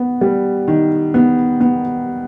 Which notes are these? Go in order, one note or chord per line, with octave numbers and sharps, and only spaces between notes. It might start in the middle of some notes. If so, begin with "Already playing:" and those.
Already playing: B3
G3
D#3
B3
B3